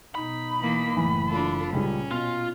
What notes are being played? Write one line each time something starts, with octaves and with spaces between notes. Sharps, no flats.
B2 D#4 B5
E3 A#3
F#1 A2 E3
D4 F4 A4
C#2 A#2 G3 C#4
B2 F4